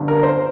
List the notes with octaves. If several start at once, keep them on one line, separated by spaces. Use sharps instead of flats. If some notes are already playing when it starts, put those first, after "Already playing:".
Already playing: G1 G2 D3
A#4
C5